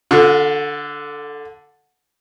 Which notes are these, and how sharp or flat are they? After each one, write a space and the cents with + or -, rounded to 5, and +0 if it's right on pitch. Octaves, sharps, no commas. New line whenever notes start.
D3 +0 F4 +40